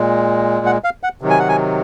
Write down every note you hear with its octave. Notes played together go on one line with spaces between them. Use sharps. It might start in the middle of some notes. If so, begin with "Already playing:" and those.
Already playing: A#2 G#3
F#5
F5
F#5
C3 D#3 F#3
G#5
F#5
G#5